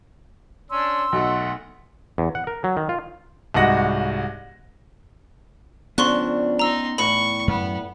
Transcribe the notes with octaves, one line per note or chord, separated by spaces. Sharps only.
C#4 D4 C6 E6
B1 A3 F#5
E2
F#5
A#4
F#3
D#3
F4
C2 G#2 F#4 D#5 F#5 A#6
C#3 F3 B3 C#4 D4 C6 C#6 F#6
D#4 A#5 C6 E6
E2 A2 B5 C#6
F#2 B3